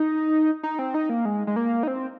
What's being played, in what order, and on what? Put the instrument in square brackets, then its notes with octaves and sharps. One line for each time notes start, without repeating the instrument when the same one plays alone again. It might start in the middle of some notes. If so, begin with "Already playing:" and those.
Already playing: [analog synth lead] D#4
D#4
C4
D#4
A#3
G#3
G#3
A#3
D#4
C4